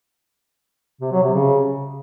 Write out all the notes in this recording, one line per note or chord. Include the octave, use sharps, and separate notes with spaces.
C3
F#3
C3
C#3